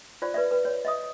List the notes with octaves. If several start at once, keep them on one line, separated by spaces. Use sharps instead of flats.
F4 C5 D5
B4 D5 E5
B4
C#5
D#5 E5 D#6